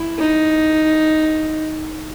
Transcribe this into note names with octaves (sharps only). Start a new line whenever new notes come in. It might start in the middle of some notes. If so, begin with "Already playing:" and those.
Already playing: E4
D#4